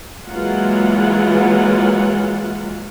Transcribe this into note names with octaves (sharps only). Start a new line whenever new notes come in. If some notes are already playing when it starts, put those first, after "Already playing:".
E3 F#3 G#3 A#3 F4 F#5